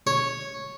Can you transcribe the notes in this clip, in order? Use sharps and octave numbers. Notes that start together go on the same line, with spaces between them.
C#5